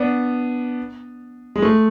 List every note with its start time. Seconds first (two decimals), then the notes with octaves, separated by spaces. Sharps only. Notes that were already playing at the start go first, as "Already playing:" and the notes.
Already playing: B3 D4
1.56 G#3
1.62 A3